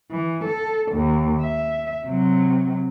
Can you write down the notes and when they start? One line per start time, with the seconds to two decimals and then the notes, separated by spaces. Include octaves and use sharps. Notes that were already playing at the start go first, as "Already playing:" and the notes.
0.12 E3
0.45 A4
0.92 D#2
1.41 E5
2.06 C3 F#3